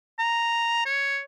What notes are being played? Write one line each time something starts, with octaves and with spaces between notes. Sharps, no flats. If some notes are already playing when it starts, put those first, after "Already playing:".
A#5
C#5